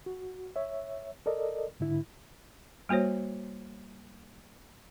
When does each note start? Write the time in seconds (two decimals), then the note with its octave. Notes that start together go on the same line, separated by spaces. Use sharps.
0.06 F#4
0.56 C#5 E5
1.26 A4 A#4 D5 D#5
1.80 G#2 D3 E4
2.89 G3 A#3 F#4 C5 C#5